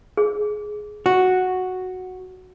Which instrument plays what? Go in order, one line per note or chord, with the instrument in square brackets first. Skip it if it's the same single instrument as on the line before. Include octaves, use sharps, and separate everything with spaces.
[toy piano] G#4
[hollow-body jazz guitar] F#4